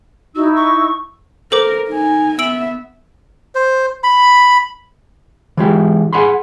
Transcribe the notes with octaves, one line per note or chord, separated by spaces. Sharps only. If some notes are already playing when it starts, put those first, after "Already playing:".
D#4 E4 F#4 E6
C#6
A4 A#4 C5 D6
D#4 G#5
B3 E5 E6 D7 F#7
C5
B5
E3 G#3 G4
G#4 F#5 G#5 B5 C6